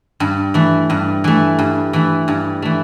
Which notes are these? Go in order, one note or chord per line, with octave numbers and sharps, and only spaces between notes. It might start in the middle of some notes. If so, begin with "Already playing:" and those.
G2
E3 A3
G2
E3 A3
G2
E3 A3
G2
E3 A3